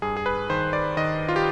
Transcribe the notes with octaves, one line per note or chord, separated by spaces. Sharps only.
G2 G#4
G#4
B4
D#3 C5
D5
D#3 D#5
F4
G4